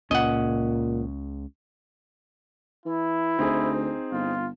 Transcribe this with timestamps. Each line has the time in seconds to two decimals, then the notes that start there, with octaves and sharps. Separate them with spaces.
0.11 C#2 A#2 C#4 D#5 F#5
2.86 E3 E4
3.39 D2 C4 D#4 G#4
4.12 G1 F4